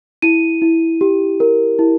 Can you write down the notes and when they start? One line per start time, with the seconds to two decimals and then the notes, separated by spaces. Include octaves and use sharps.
0.22 E4 D#7
0.62 E4
1.01 G4
1.40 A#4
1.79 E4